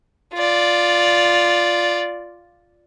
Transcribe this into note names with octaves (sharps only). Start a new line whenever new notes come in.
F4 D5